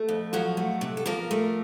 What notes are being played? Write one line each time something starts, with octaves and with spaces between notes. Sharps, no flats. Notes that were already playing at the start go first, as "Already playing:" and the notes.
Already playing: A3
F2
F3 F#3 F#4
A3
C3
A4
F3 A#3 A#4
A3